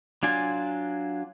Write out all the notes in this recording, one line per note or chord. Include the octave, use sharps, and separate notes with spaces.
F#3 D4 F4 G#5